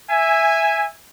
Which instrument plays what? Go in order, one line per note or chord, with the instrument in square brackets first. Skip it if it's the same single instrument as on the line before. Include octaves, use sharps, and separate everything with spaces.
[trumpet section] E5 G#5